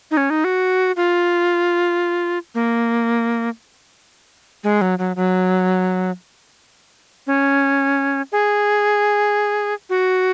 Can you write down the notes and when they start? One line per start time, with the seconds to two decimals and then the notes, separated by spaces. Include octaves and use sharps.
0.11 D#4
0.17 C#4
0.30 D#4
0.44 F#4
0.96 F4
2.55 A#3
4.64 G#3
4.81 F#3
4.99 F#3
5.16 F#3
7.27 C#4
8.32 G#4
9.90 F#4